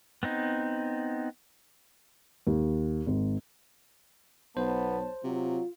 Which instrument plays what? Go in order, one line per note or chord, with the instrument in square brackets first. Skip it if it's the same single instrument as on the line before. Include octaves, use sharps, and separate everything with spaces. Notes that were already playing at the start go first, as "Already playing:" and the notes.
[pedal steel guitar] B3 C4 D#4
[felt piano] D#2
G#1
[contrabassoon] B1 [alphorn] B3 [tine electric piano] C5 [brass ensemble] C#5 A5
[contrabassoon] C3 [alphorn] F#3 [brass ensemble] F4